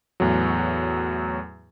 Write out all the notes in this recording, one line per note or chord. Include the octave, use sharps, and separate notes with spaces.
E2 A2 F#3